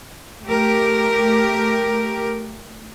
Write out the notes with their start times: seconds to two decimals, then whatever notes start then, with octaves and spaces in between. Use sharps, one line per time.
0.43 A3 G4 A#4